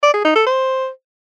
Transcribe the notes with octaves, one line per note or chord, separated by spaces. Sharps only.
D5
G#4
D#4
A4
C5